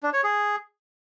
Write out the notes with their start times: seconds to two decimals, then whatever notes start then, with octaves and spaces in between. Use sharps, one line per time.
0.03 D4
0.13 C#5
0.24 G#4